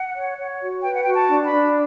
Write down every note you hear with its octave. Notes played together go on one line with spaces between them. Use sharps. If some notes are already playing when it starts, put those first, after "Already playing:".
Already playing: F#5
C#5
C#5
F#4
B4 G5
F#5
G5
F#4
A5
D4
B5
D4